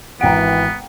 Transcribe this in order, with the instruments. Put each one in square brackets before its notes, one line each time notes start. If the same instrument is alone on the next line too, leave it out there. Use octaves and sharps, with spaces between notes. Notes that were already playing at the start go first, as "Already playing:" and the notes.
[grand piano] G#1 D7 [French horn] E3 [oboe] B3 [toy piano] F#5 G5 A#5